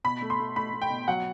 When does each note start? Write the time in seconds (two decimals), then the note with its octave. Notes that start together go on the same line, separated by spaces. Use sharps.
0.04 B2 B5
0.22 A3
0.30 C6
0.39 A3
0.56 A3 B5
0.73 A3
0.82 G5
0.90 B2
1.08 F#3 F#5